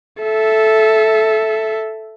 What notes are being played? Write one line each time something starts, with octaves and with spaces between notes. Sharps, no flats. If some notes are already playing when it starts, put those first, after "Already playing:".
A4 E5